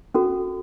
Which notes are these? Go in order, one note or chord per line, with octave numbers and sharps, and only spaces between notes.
C#4 F#4 A4